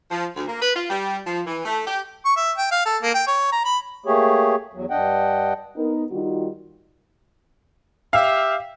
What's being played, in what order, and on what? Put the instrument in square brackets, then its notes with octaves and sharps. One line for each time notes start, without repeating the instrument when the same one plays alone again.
[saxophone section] F3
D2
A#3
B4
F4
G3
F3
E3
A3
G4
[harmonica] C#6
E5
G5
F5
A4
A#3
G5
C#5
A#5
B5
[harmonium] A3 A#3 G4 G#4 C#5
E2 F#3
G2 D4 D#5 F#5 G5
[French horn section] B3 D#4 A#4
D#3 G3 D#4 F4 F#4
[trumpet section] G4 E5 [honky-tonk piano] F5